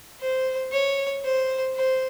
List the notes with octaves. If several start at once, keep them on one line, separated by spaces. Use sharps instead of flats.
C5
C#5
C5
C5